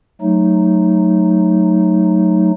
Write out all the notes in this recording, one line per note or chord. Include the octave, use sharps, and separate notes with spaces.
F#3 A3 D#4